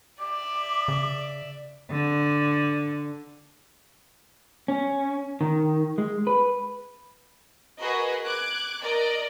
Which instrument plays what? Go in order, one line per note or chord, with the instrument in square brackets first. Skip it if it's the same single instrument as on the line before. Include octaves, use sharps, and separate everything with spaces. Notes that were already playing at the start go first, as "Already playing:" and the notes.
[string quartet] D5 E5 [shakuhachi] D6
[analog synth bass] C#3
[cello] D3
[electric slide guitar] C#4
D#3
G#3
B4
[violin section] F#4 G#4 A#4 B4 D#5
D6 F#6 G#6
A#4 D5 D#5